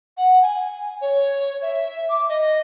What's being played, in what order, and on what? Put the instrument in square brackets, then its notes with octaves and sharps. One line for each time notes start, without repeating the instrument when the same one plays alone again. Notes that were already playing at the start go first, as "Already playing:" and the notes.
[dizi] F#5
G#5
C#5
E5
D6
D#5